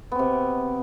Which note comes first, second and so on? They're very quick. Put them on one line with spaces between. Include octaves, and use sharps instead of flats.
B3 C4 C3